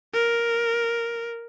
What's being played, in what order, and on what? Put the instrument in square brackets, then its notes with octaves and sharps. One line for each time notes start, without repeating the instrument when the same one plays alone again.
[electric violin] A#4